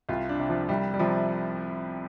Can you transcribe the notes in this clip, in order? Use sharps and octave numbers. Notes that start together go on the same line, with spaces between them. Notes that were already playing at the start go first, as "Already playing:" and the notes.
C2 F4
D4
C3
F3
C2 G3
G3
C3 F3